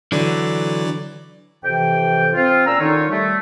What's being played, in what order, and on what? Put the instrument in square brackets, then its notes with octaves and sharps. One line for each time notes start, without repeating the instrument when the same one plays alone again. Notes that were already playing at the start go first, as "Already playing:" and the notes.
[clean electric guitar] D3 [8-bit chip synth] E3 F#3 D5
[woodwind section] F2 C3 E3 G5
C4 F4
A#2 C#4 A#5 E6
D3 D#3 D#4 F4 C#5
G3 A3